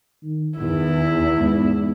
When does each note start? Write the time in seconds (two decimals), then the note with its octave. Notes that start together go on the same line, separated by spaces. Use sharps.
0.24 D#3
0.58 E2 D#3 E4
1.38 G#2